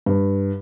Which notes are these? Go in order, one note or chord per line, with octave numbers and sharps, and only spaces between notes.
G2